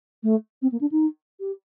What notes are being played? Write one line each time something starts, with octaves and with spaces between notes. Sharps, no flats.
A3
C4
A#3
D4
D#4
G4